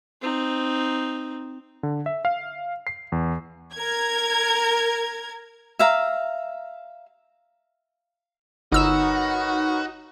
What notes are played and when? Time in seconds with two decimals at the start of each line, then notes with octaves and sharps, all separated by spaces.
0.22 C4 D#4
1.83 D3
2.06 E5
2.25 F5
2.87 C7
3.12 E2
3.75 A#4 G#6
5.79 E5 F5 A#5
8.72 G1 D#4 F#4 A#4 B4 C#5 E6 E7